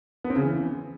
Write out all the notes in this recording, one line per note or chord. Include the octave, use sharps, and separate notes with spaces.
B3
C4
C#3
E3